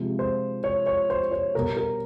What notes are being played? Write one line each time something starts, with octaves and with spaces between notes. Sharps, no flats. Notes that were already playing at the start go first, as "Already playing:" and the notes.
Already playing: C3 F3 G#3
C5
C#5
C#5
C5
C#5
B2 G3 A#4
A#4